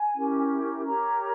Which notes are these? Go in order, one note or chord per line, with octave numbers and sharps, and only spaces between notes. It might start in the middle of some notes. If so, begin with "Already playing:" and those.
Already playing: G#5
C#4 E4 G4 A#4
G4 A#4 C#5 A#5